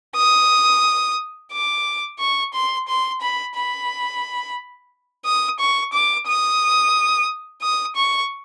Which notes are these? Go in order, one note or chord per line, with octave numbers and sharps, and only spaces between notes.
D#6
D6
C#6
C6
C6
B5
B5
D#6
C#6
D6
D#6
D#6
C#6